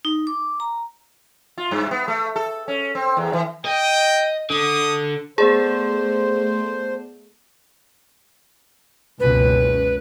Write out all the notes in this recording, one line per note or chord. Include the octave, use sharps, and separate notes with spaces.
D#4
D6
A#5
F4
G2
B3
A3
A4
C#4
C4
E2
E3
D#5 G5
D3 D#6
A3 B3 G#4 C5 D5 A5
F#1 C#2 B2 B4